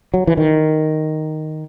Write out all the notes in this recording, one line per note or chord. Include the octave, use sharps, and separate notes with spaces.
F#3
E3
D#3